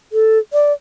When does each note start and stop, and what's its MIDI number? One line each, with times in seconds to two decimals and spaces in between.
0.12 0.38 69
0.53 0.73 74